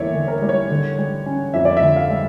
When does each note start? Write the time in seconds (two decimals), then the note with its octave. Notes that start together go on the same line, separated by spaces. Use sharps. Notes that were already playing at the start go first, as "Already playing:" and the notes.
Already playing: E2 D3 G3 A#3 C#5 D5 E5
0.14 D3
0.28 A#4
0.42 G3
0.49 C#5
0.70 D3
0.98 G3
1.26 C#4
1.54 F2 E5
1.65 D5
1.77 E5
1.82 D3
1.96 F5
2.10 G3